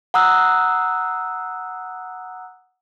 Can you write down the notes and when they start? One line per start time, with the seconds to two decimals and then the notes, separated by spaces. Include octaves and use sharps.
0.14 F#5 A#5 D#6 E6 F#6